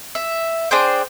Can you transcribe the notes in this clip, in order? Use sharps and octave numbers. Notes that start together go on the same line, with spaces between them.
E5
D4 G#4 C5 G5